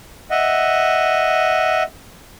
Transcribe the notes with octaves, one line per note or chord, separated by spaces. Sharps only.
D#5 E5 F#5